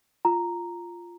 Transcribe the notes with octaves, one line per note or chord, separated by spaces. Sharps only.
F4 A#5